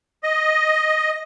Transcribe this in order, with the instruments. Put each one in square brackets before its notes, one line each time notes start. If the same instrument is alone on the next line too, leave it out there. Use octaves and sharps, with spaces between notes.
[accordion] D#5